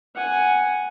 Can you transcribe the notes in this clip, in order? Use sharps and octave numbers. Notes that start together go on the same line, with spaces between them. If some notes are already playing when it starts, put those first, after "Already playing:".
F#5 G#5